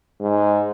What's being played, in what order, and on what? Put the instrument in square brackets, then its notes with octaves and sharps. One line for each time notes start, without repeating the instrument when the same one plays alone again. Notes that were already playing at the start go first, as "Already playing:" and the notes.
[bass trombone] G#2